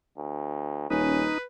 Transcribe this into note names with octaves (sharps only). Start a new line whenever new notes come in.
D2
D#1 C#4 D#4 B4